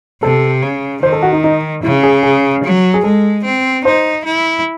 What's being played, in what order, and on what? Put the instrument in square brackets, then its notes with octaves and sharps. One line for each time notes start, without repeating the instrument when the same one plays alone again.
[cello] C3 [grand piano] A4
[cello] C#3
[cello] D#3 [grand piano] C5
[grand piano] A4
F#4
D#4
D#4
[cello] C#3 [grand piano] E4
[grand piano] G#4
G#4
[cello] F#3
[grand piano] G#4
[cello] G#3 [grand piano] A4
[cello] C4
[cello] D#4 [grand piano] C5
[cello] E4